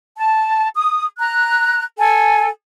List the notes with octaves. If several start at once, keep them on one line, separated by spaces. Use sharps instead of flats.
A5
D#6
A#5 F#6
A4 G#5